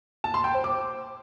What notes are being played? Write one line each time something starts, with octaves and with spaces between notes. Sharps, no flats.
A5
C6
G5
C5
D6